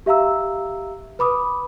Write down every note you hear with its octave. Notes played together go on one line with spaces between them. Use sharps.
G4 E5 F5 A#5 E6
B4 B5 D6 D#6